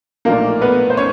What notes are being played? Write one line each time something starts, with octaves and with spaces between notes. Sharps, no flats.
B1 A#2 F3 A3 A#3 D4 A#4
B3 B4
C5
C#4 C#5